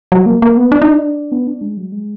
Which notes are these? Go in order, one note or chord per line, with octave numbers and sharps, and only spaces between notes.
F#3
A#3
A#3
B3
D4
D#4
D4
B3
D4
G#3
F#3
G#3